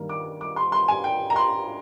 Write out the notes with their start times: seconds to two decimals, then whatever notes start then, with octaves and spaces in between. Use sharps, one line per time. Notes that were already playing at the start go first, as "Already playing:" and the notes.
Already playing: G2 D#3 G3 A#3
0.09 D6
0.41 D6
0.56 C6
0.72 C6
0.88 G#5
1.04 G5
1.30 A#5
1.36 C6